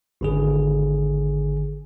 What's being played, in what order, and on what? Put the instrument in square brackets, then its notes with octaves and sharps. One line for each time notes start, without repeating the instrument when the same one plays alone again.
[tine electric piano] G#1 D3 G#4